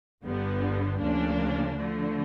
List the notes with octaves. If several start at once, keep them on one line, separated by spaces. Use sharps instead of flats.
G1 G2 D3 G3 B3
D2 C#3 F3 A#3 D4
D3 F3 A3